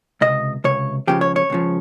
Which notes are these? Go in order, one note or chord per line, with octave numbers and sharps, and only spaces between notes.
C#2 C3 D#5
C#2 C3 C#5
C#2 C#3 F3 G4
C#5
C#5
C#2 C#3 F3